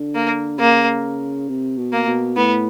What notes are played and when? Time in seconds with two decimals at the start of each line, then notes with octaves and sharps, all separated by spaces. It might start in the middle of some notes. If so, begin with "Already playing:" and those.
Already playing: D3
0.15 A#3
0.58 C#3 A#3
1.48 C3
1.78 B2
1.93 A#3
2.07 B2
2.37 A2 B3